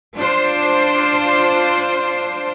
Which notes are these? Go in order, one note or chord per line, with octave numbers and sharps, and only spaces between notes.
D4 F4 C5